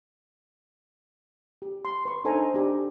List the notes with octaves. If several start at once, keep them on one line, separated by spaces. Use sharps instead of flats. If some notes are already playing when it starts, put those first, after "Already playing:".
G4
C6
B4 C#6
D4 D#4 A4 C5 G#5 A#5
D4 G4